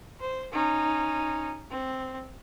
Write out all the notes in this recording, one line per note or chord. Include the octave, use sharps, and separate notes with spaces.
C5
C#4 D#4
C4